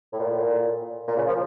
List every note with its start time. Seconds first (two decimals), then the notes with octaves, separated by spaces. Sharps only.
0.12 A2
0.19 A#2
0.29 A2
0.39 A#2
1.08 A#2
1.17 C#3
1.27 F3